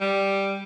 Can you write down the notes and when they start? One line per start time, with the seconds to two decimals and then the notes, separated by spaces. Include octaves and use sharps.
0.01 G3